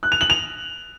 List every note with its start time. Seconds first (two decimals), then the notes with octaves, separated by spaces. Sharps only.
0.03 F#6
0.12 F7
0.21 F#7
0.30 F7